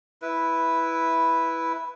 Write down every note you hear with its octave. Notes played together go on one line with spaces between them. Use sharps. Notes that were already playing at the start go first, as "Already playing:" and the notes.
E4 B4